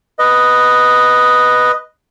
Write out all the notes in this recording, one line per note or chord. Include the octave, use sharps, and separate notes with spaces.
B4 D#5